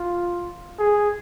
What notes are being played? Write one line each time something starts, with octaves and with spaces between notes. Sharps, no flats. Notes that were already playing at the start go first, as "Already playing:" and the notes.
Already playing: F4
G#4